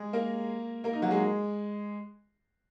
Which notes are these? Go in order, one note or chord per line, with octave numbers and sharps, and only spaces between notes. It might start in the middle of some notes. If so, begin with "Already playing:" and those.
Already playing: G#3 G#4
A#3 A#4
A#3 A#4
D#4
F#3 F#4
G#3 G#4